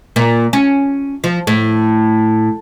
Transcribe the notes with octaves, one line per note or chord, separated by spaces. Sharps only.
A#2
C#4
F3
A2